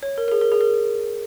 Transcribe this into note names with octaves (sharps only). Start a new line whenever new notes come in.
C#5
A#4
A#4
G#4
A#4
G#4
A#4